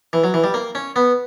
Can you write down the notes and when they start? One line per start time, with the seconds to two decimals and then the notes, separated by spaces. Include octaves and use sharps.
0.13 E3
0.24 F#3
0.34 E3
0.44 G3
0.54 A#3
0.75 C#4
0.96 B3